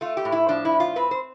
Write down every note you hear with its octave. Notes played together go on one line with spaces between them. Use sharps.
A3 F4
G4
A2
E4
F3 D4
E4
A2
F4
C4 B4
C5